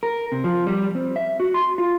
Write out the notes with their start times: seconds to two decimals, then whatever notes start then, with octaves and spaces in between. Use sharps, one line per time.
0.03 A#4
0.32 C3
0.44 F3
0.67 G3
0.95 C4
1.16 E5
1.40 F#4
1.54 C6
1.78 F4